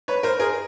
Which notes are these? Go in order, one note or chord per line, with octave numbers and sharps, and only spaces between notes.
B4 C#5
A#4 C5
G#4 A#4